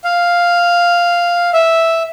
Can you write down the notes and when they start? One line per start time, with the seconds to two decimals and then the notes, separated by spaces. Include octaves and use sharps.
0.04 F5
1.53 E5